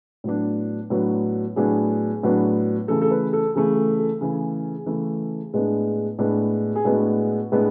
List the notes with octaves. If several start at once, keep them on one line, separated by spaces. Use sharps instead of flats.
A2 F#3 B3 D4
A2 F#3 B3 D4
A2 F#3 B3 D4 G#4
A2 F#3 B3 D4
C#3 E3 A3 A4
A4
B4
A4
C#3 E3 A3 G#4
A4
A4
C#3 E3 A3 G#4
C#3 E3 A3
A2 G#3 B3 D4
A2 G#3 B3 D4
G#4
A2 G#3 B3 D4 F#4
A2 G#3 B3 D4